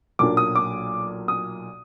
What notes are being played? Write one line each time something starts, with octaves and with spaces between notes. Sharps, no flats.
B1 A#2 F#3 A#3 D4 D6
D#6
D6
D#6